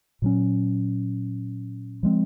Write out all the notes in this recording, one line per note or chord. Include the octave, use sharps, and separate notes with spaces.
A#2 F#3 C#4
F3 G#3 C4